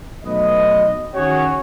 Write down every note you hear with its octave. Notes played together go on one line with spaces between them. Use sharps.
B1 A3 B4 D#5
D#3 C#4 F#4 G#4 C#5